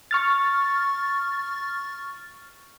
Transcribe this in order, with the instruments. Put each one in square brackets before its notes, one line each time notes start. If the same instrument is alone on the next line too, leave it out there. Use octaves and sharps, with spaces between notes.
[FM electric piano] C#6 F6 A6